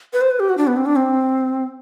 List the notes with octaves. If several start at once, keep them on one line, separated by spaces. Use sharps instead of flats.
B4
C5
B4
G4
F#4
D4
B3
C4
D4
C4